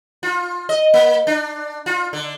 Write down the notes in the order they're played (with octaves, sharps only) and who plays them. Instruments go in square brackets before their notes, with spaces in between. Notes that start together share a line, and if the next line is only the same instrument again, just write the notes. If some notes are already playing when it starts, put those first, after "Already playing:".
[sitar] F4
D#5
A#3
D4
F4
D3